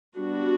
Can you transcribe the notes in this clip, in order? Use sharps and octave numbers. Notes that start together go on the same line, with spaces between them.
G3 B3 D4 F#4